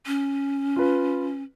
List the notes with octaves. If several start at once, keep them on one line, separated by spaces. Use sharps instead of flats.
C#4
F4 B4